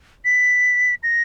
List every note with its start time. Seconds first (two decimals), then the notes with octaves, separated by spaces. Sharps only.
0.25 B6
1.03 A#6